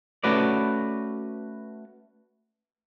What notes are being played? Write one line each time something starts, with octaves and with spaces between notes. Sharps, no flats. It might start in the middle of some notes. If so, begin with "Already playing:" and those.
A3 C#4 F#4 B4 D5